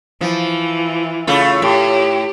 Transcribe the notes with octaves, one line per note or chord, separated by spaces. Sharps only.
E3 F3
C#3 A3 F4
A2 G4